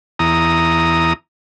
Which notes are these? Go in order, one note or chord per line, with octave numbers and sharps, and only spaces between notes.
E2 A#5 D#6